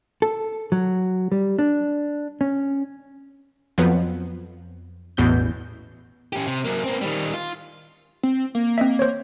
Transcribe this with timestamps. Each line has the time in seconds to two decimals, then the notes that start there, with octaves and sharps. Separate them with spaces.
0.22 A4
0.72 F#3
1.32 G3
1.59 D4
2.41 C#4
3.78 F2 F3 F#3 B3
5.17 A1 E2 B2 G6
6.33 C#4 G4
6.47 C3
6.65 F#3 A#3
6.84 A#3 C4
7.01 D#3 G3
7.34 F4
8.23 C4
8.55 A#3
8.78 C4 D#5 E5
8.99 C5 C#5